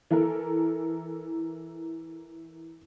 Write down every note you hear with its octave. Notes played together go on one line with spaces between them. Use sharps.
E3 E4 A4 A#4